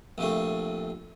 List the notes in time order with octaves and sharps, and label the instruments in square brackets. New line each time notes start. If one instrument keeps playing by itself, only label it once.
[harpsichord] A#1 C3 A3